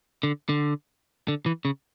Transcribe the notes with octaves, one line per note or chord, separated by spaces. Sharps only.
D3
D3
D3
E3
C#3